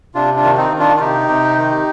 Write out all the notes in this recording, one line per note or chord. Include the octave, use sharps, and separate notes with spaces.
C3 D4 F4
D4 F4
D#3
C4 D#4
D#3
D4 F4
F4
C3 D#4 G4
C3
D#3